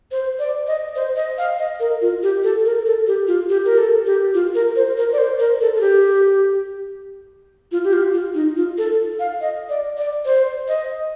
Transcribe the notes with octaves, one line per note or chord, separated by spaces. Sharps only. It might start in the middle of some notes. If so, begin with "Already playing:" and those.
C5
D5
D#5
C5
D#5
F5
D#5
A#4
F4
G4
A4
A#4
A4
G4
F4
G4
A#4
A4
G4
F4
A#4
C5
A#4
D5
C5
A#4
A4
A4
G4
F4
G4
F4
F4
D#4
F4
A4
F5
D#5
D5
D5
C5
D#5